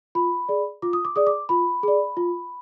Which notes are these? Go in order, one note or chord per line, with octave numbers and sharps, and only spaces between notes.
F4 B5
G#4 D5
F4 D6
D#6
D6
G#4 D5 D#6
D6
F4 B5
G#4 D5
F4